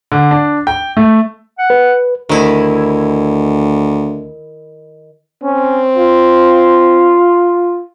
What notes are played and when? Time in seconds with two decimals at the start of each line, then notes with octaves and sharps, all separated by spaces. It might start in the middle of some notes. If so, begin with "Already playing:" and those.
0.12 D3
0.31 D4
0.67 G5
0.97 A3
1.59 F#5
1.70 B4
2.29 D2 D#3 E4
5.43 C4 C#4
5.97 F4